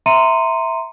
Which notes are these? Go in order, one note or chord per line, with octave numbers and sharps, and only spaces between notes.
E5 A#5 C6 C#7 D#7